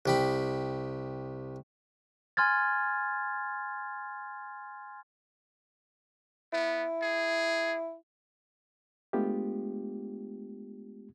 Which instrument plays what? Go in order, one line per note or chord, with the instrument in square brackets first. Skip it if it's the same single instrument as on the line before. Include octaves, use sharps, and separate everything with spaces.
[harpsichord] C2 G4 B5
[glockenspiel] G#5 C6 F6 G#6 A6
[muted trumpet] B3 [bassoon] E4
[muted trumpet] G#4
[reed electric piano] G#3 A3 B3 D4 F4 G4